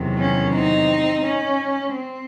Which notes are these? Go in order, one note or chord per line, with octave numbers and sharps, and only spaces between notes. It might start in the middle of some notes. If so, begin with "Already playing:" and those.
Already playing: E2 C3 D#3 F#3
C#4
C4 D#4
C#4
C4